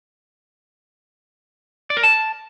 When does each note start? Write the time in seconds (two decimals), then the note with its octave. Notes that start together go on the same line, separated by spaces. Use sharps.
1.90 D5
1.97 A#4
2.03 A5